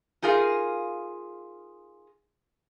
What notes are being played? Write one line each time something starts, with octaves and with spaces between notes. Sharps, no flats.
D#4 F4 G#4 A#4 F5